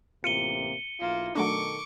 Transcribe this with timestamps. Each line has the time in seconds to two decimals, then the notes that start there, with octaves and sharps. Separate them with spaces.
0.24 A1 C3 A#3 F4 C#7 D#7 G7
1.00 B1 A#3 E4 F4
1.35 B2 D#3 F#3 A3 D4 A4 C#6 D6